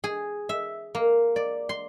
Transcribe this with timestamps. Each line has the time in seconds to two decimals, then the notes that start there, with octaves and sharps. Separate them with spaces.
0.04 G#4
0.49 E5
0.95 A#3
1.36 D5
1.69 C6